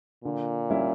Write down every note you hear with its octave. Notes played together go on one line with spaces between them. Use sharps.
A#2 D3
G3 C#4 E4